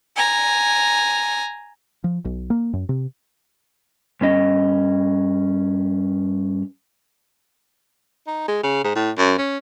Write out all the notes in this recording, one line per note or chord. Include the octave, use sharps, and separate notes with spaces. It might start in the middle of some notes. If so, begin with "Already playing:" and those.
G#5 A#5
F3
B1
A#3
F#2
C3
G2 C#4 D#5
D#4
G#3
C#3
G#2
A2
F#2
C#4